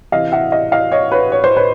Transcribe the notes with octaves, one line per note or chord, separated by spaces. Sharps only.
C3 E3 D#5 F5
E5 F#5
D#5 F5
D#5 F5
C#5 D#5
B4 C#5
C#5
C5
B4 C#5